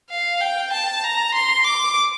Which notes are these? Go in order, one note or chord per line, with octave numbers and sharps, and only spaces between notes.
F5
G5
A5
A#5
C6
D6